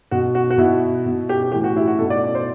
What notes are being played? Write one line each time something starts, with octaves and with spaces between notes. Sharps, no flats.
B2 F#4
F#4
F#4
B2 E4
B2
G4
A2 E3 G4
F#4
E4
F#4
B2 A4
D5
C5